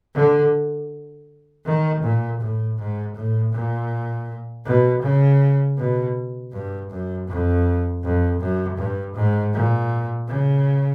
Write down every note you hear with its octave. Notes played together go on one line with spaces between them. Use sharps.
D3
D#3
A#2
A2
G#2
A2
A#2
B2
C#3
B2
G2
F#2
F2
F2
F#2
G2
G#2
A#2
C#3